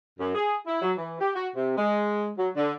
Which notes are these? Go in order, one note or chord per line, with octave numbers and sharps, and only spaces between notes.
F#2
G#4
E4
F#3
E3
G4
F#4
C3
G#3
F#3
D3